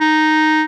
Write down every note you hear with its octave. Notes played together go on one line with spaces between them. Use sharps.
D#4